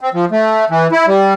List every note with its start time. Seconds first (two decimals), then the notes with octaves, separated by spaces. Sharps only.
0.01 C4
0.14 F3
0.31 A3
0.70 E3
0.92 E4
1.07 G3